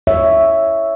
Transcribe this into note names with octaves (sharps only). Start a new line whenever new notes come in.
C#5 E5